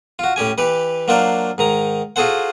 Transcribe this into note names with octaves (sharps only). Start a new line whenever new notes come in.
F4 F#4
A2 C#4 G4 G#5
E3 G4 B4
F#3 A#3 D4 F4 C5 D5
G#2 D#3 A#5
F4 F#4 G#4 A4 C5 F#5